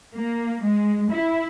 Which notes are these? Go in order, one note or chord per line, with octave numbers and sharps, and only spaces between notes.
A#3
G#3
E4